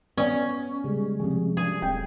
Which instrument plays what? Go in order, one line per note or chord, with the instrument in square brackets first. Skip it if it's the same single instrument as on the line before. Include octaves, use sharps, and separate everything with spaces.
[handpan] B3 [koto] C#4 [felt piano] D5 G#5
[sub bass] C#3 [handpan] G3 G#3
[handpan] C3 G#4 [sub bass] F3
[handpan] F#3 D4 [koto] G#4
[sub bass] D#1 [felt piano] G5